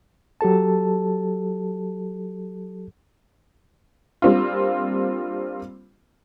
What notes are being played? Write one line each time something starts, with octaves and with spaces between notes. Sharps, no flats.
F#3 G4 A4 A5
G3 A#3 C4 D4 F4